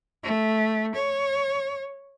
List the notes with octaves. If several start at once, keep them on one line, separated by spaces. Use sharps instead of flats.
A3
C#5